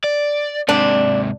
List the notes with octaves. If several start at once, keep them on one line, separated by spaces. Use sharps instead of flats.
D5
G#2 C3 D4